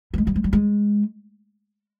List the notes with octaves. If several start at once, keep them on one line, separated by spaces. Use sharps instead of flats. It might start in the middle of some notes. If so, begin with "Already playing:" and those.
G3
G#3
G3
G#3
G3
G#3